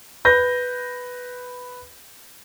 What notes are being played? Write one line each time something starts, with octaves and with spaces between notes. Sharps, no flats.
B4 G6 A#6